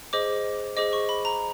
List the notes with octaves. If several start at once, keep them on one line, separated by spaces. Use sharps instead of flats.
G#4 C5 D#5 D6
G#4 C5 D#5 D6
C#6
B5
A#5